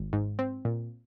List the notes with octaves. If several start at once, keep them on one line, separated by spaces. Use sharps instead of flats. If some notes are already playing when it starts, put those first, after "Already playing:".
Already playing: G#1
G#2
C4
A#2